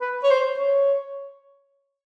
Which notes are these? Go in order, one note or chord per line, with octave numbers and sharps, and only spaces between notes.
B4
C#5
C5
C#5